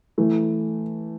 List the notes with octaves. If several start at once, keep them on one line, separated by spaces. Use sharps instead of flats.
E3 A3